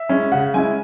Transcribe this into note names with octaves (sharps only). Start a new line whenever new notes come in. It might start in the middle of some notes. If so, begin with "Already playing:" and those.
Already playing: E5
G#3 C#4 E4
C#3 F#5
G#3 C#4 E4 G#5